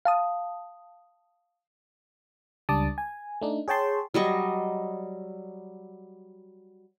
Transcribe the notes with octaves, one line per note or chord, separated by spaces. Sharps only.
F5 A5 D#6
C#2 G3 D4 A5 D6 D#6
G#5
A3 D4 D#4
G#4 C#5 G5 A5 C6
F#3 G3 D#5 C#6